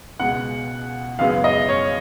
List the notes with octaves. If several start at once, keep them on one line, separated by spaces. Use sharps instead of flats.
C#2 B2 G#3 F#5
F#2 C#3 G#3 B3 F5
D#5
C#5